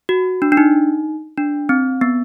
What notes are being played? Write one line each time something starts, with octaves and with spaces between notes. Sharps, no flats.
F#4
D4
D4
D#4
D4
C4
B3